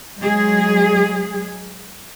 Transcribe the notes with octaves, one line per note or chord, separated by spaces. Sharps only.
F#3 G#3 G#4